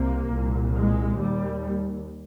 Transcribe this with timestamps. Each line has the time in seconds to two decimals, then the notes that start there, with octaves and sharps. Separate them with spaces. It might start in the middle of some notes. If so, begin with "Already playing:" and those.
Already playing: C2 C3 A#3
0.31 C2 A#2
0.75 G#3
1.18 D#2 G3